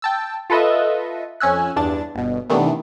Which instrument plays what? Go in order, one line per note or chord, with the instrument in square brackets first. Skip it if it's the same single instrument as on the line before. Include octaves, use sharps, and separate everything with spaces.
[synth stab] G5 A5 E6
F4 A4 B4 D#5 E5
F2 C#4 G#5 E6 F#6
E2 G2 D4 A6
G1 B2
C3 D#3 E3 A3 B3 D4